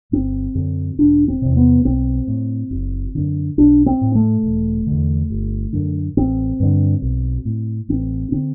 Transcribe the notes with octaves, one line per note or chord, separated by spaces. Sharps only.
G1 C4
F#2 D3
E1 D4
C4
E2 C3
B3
B1 C4
A2
F#1
F#2 D3
B1 D4
C4
A2
A3
E1
E2 D3
G1
F#2 D3
A1 C4
G2 D3
B1
A2
A1 C4
D3 C4